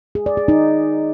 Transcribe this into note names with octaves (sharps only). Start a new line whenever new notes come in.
G#4
D5
G#4
D#4